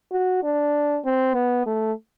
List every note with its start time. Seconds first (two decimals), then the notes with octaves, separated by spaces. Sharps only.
0.11 F#4
0.43 D4
1.05 C4
1.34 B3
1.66 A3